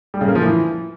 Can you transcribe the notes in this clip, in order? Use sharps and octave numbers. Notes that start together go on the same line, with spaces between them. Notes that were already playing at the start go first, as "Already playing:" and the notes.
G3
C#3
A#3
F3
E3